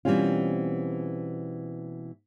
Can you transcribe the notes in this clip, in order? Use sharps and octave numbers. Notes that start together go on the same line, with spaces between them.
B2 E3 G3 C4 C#4 F4